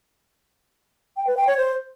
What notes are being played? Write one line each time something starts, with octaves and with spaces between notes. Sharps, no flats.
G5
B4
G5
C#5
C5